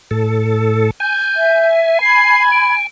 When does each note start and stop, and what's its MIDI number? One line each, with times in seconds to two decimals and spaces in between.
0.11 0.91 45
0.11 0.91 69
1.00 2.87 80
1.00 1.68 91
1.36 1.99 76
2.02 2.72 83
2.02 2.72 92
2.02 2.43 96
2.52 2.85 98